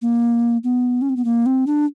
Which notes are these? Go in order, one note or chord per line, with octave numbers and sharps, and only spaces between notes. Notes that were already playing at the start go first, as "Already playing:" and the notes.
A#3
B3
C#4
C4
B3
A#3
C4
D4